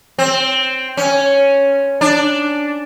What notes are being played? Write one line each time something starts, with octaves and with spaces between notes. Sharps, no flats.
C4
C#4
D4